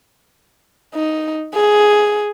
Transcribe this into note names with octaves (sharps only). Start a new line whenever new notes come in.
D#4
G#4